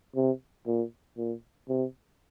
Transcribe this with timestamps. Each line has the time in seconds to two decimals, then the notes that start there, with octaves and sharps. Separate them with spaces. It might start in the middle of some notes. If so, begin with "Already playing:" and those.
0.16 C3
0.67 A#2
1.17 A#2
1.69 C3